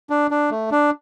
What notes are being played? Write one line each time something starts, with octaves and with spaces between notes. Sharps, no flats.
D4
D4
A3
D4